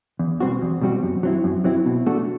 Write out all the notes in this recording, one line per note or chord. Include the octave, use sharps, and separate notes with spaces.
E2
B2 G3 C4 F#4
E2
B2 G3 C4 F#4
F#2
F#3 C4 E4
F#2
F#3 C4 E4
B2
A3 D4 F#4